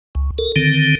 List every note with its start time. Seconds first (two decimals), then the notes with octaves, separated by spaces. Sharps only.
0.15 C#2
0.38 A4 A#4
0.56 D3 D#3 C4